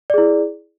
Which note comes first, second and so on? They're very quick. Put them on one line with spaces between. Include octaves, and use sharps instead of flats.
D5 G#4 E4